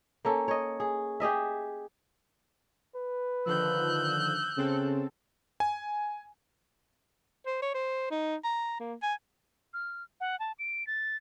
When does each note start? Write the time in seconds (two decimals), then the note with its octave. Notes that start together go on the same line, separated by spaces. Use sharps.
0.25 A#3 C#4 A4
0.48 C#5 D#5
0.80 G#4
1.20 G4 G#4 D#5 E5
2.95 B4
3.46 D3 D#3 F3 E6 F#6 G6
4.57 C#3 C4 A4
5.60 G#5
7.46 C5
7.62 C#5
7.74 C5
8.10 D#4
8.44 A#5
8.80 A#3
9.02 G#5
9.74 F6
10.20 F#5
10.39 A5
10.59 D7
10.87 A6